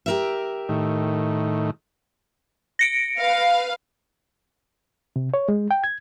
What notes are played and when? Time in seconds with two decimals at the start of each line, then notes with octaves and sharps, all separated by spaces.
0.06 G4 A#4 E5
0.69 A2 D#3
2.79 A#6 C#7 D7
3.20 B4 F5
5.16 C3
5.34 C#5
5.49 G#3
5.71 G5
5.84 G#6